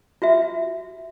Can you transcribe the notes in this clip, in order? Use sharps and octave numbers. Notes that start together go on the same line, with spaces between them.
F4 F#4 E5